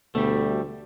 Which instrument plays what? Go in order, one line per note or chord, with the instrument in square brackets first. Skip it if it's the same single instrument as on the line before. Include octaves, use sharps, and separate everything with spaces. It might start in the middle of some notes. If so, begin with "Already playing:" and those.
[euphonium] D2 [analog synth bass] B2 [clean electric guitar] G3 A3